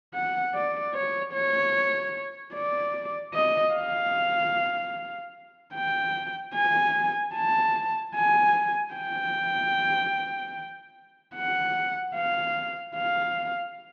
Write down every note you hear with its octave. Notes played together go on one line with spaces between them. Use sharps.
F#5
D5
C#5
C#5
D5
D#5
F5
G5
G#5
A5
G#5
G5
F#5
F5
F5